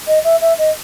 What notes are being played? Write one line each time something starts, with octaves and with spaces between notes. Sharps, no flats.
D#5
E5
E5
D#5